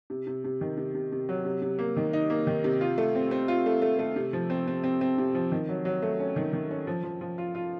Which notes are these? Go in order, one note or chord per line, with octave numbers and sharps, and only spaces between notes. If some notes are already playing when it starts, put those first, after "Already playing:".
C3
C3
C3
D#3
C3
C3
C3
F#3
C3
C3
A#3
D#3
D#4
A#3
D#3
C3
F4
A3
C4
C4
F4
A3
A3
A3
C3
F3
C4
C4
C4
C4
C3
F3
D#3
F#3
F#3
A3
C#4
D#3
D#3
C#4
F3
F3
F3
F4
F4